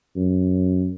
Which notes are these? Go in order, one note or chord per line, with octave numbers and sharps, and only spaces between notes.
F#2